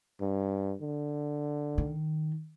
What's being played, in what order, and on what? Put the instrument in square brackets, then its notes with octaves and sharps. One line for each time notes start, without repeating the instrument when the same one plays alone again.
[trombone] G2
D3
[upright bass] D#3